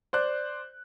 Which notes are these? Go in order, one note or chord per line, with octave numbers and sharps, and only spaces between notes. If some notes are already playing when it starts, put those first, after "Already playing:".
C5 D5 F#6